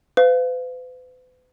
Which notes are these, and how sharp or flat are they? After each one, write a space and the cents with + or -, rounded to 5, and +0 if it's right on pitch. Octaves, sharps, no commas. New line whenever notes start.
B4 +40 F5 +0